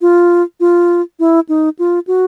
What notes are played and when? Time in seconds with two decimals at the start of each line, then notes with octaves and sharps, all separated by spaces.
0.01 F4
0.60 F4
1.19 E4
1.49 D#4
1.79 F4
2.07 F#4